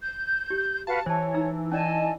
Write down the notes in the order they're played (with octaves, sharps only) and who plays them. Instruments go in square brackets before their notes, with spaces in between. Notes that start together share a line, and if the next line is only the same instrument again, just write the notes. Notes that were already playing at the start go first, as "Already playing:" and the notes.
[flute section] G6
[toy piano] G4
[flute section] F#4 B4 F5 [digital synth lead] A5
[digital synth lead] E3 [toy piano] C5 A5 [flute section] C#5
[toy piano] D#4 A#5 E6
[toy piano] C#4 D5 [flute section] D#5 G#5 A5